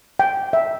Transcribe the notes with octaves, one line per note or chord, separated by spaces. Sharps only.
G5
E5